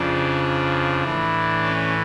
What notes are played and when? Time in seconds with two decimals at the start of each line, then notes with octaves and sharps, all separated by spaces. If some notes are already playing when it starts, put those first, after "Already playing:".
Already playing: F2 C#3 F3 D4
1.03 A2 E3
1.63 C#4